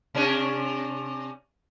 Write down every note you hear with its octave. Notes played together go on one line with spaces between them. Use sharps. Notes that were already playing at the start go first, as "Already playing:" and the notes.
C3 C#4 D4